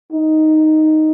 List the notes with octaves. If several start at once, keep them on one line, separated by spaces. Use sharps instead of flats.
D#4